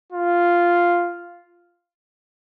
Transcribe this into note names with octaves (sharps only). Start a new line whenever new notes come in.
F4